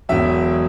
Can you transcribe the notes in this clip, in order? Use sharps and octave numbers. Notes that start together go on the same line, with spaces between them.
E1 E2 B2 F#3 E5